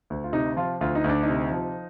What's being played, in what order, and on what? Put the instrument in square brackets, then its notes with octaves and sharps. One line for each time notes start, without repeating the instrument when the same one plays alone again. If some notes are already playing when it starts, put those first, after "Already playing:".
[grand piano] D2
F4
C3 D#4
F3 F4
D2 F4
D#4
D2
D4
D#4
C3
F3